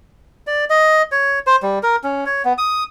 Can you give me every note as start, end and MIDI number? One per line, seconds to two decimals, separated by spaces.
0.47 0.65 74
0.70 1.02 75
1.12 1.39 73
1.47 1.56 72
1.62 1.79 55
1.83 1.96 70
2.04 2.25 61
2.26 2.42 73
2.45 2.53 59
2.58 2.84 87